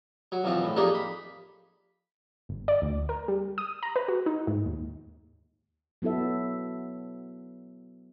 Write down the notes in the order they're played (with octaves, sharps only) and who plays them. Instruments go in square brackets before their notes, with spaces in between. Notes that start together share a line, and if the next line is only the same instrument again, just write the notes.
[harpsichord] F#3
B1 E2 F3 C4
A2
F2 A#3 D#4 G4 G#4 D5
B5
[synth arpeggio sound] G1
D5
D2
A#4
G3
D#6
A#5
B4
F#4
D#4
G#2
D#2
[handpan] F#3 B3 E4 A4 E5